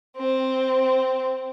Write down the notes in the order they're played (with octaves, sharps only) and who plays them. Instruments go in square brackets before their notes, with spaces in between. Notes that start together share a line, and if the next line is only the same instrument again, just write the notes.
[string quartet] C4